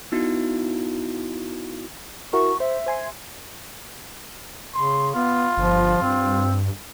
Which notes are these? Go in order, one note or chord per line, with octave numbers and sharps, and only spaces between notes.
B3 D#4 E4 F#4
E4 F#4 A#4 C#6
C5 E5
C5 G#5 C6
C#3 C6
B3 F4
G1 F3
G2 C4